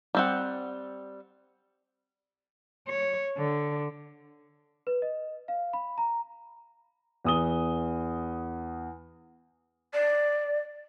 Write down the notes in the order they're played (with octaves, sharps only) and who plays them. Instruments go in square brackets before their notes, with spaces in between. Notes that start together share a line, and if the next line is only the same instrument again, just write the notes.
[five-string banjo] G3 C4 F#5
[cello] C#5
D3
[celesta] B4
D#5
F5
B5
A#5
[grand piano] E2 D#6 G7
[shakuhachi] D5